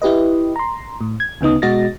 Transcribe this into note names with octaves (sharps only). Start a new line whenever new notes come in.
E4 G4 B4 D#5
A#5 C6
A2
G#6
D2 C#3 B3 D#4 D#6
B2 G#3 F#4 D#5 A6 A#6